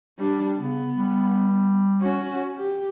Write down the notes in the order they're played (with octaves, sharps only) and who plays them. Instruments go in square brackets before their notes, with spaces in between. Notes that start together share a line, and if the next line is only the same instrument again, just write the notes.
[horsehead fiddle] G3 D4
[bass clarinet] C#3 [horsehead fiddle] B3
[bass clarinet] G3
[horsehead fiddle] C#4 F#4
G4